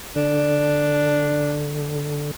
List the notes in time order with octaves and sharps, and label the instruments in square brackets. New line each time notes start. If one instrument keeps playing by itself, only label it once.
[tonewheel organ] D3 [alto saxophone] D4